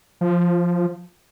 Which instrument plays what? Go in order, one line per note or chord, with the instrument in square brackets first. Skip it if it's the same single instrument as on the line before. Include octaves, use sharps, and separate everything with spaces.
[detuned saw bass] F3